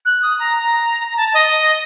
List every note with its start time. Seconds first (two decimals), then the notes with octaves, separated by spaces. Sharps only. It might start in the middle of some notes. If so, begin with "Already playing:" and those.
0.05 F#6
0.22 D#6
0.40 A#5
0.57 A#5
1.08 A#5
1.17 A5
1.34 D#5